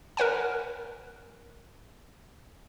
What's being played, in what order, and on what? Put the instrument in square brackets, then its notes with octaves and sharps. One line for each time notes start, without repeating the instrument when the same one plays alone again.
[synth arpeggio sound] A#4 B4 F#5 G#5